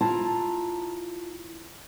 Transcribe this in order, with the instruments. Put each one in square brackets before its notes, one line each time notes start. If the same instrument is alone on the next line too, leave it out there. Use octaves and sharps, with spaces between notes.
[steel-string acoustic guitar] E4 F4 A5 A#5